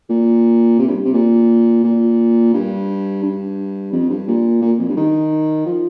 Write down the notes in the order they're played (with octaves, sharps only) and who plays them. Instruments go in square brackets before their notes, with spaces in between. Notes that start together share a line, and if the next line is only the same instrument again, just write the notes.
[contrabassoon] A#2
C3
G2
C3
A#2
A#2
G2
G2
F2
G2
A#2
A#2
F2
G2
D#3
F3